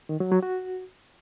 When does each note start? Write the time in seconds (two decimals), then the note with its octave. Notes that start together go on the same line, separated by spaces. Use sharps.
0.09 D#3
0.20 F#3
0.31 F#3
0.43 F#4